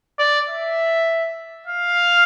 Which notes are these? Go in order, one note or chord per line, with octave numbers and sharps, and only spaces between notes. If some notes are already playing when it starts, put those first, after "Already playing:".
D5
E5
F5